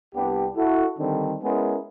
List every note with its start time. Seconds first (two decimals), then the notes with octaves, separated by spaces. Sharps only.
0.15 C2 B3 D4 G4
0.56 E4 F#4 A4
0.99 D3 D#3 G3 C4 D4
1.43 G#3 B3 C#4 E4 G#4 A#4